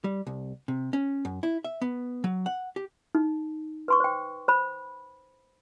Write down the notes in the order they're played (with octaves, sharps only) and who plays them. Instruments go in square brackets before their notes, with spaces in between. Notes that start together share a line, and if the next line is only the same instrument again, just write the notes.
[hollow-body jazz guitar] G3
C2
C3
C#4
F#2
E4
E5
B3
F#3
F#5
G4
[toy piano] D#4
B4 C6 C#6
C5 G5
C5 B5